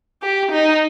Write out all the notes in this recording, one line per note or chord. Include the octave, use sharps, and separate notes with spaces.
G4
D#4